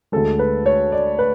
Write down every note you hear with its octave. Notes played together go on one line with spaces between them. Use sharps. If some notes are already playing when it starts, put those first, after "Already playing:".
D2 D3 G#3 A4
B4
C#5
D5
B4